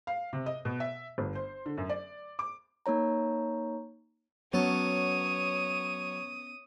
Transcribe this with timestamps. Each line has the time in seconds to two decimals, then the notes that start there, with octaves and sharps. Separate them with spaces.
0.07 F5
0.33 C3
0.46 D#5
0.65 B2
0.80 E5
1.18 G1
1.35 C5
1.66 D3
1.78 F#2
1.89 D5
2.39 D6
2.86 A#3 D#4 C#5 A#5
4.53 F#3 B3 C#4 A4 C#5 D#6